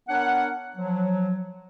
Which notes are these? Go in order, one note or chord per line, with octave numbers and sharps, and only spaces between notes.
B3 D4 A#4 C#5 F#5
F3 F#3